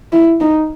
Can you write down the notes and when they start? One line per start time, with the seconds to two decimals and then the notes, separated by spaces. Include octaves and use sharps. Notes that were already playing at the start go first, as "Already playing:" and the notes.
0.12 E4
0.41 D#4